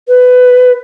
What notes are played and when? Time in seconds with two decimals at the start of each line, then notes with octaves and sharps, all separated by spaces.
0.08 B4